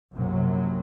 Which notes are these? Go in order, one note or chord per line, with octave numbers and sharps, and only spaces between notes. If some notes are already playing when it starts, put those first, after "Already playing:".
A#1 F#2 C3 F#3